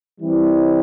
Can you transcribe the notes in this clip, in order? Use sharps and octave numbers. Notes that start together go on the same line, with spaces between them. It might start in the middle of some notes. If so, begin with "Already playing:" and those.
E3 G3 C4 E4